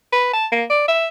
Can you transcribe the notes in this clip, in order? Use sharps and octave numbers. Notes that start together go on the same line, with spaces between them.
B4
A5
A#3
D5
E5